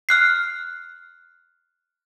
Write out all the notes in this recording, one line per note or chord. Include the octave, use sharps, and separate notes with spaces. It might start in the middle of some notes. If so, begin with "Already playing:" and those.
F6 F#6 C7